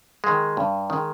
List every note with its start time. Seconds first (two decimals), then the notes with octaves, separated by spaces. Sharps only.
0.24 D#3 G#3
0.57 G2
0.90 D#3 G#3